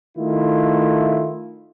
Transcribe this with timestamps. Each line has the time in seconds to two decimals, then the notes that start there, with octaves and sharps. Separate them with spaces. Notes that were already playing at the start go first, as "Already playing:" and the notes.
0.16 D#3 A3 E4 F4